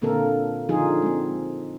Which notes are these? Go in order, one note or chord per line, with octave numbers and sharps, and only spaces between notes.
A#2 D3 A#3 C4 A4 A#4
D3 F3 D#4 F4 G#4
G#3 C4